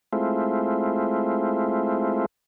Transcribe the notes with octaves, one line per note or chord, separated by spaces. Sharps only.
G#3 A3 C4 E4 F4